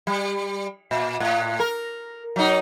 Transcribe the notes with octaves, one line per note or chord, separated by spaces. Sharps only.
G3
A#2
A2
A#4
F#3 D#4